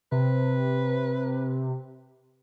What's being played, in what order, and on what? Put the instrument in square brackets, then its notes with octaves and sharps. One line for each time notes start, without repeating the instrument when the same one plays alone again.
[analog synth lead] C3 [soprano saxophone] B4